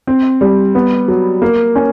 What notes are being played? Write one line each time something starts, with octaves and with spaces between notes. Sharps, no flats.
C4
G3
B3
F#3
A#3
C#4